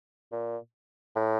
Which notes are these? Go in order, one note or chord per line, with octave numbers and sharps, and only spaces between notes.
A#2
A2